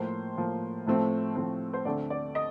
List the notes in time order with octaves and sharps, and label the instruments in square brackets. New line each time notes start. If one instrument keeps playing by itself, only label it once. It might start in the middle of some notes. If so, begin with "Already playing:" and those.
Already playing: [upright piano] A2 F3 A#3 C5
A2 F3 A#3
A2 F3 A3 C4
A2 F3 A3 C4
C5
D2 D3 A3 C4 D5
D5
D#5